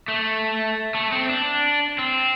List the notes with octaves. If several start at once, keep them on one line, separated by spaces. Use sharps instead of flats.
A3
A3
C4
D4
C4